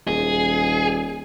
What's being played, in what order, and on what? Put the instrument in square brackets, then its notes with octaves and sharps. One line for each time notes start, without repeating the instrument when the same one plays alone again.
[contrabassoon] D#1 [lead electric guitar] G#4